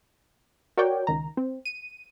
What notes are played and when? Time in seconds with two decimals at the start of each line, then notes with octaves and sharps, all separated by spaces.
0.77 F#4 A#4 C#5 D5 G5
1.07 C#2 D#3 A#5
1.37 C4
1.65 D#7